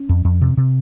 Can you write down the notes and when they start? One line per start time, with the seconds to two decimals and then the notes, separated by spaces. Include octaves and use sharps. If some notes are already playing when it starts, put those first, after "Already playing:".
Already playing: C#4
0.09 F2
0.25 F2
0.41 C3
0.57 C3